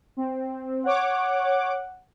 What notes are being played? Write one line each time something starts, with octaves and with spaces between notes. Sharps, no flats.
C4
C#5 F#5 D6